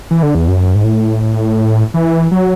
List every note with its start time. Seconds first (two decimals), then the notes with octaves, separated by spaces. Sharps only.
0.11 E3
0.23 D3
0.35 E2
0.48 F#2
0.75 G#2
0.84 A2
1.94 E3
2.31 F#3